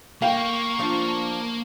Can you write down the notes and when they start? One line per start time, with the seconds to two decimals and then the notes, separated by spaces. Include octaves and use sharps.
0.22 A#3 F5 G5 C#6
0.79 F3 D4 F4